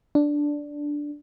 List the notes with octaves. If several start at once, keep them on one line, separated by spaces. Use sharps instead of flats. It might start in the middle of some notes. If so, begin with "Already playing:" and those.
D4